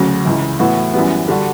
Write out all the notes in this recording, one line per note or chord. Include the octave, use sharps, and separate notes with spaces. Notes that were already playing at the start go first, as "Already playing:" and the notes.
Already playing: D2 C#3 F#3
C#2 C#3 E3
A2 E3 B3 F#4
F#2 E3 G3 B3
D3 G3 D4 F#4